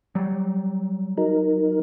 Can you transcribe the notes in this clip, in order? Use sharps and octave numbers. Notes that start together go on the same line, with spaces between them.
F#3 G3
F#3 D#4 A#4